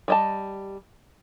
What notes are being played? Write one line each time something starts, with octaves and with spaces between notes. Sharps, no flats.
G3 D#5 A5